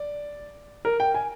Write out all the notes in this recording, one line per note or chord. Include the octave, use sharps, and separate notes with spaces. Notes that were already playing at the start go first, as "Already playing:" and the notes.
Already playing: D5
A#4
G5
G#5